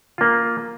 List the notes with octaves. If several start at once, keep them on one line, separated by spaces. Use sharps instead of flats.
A#3 F4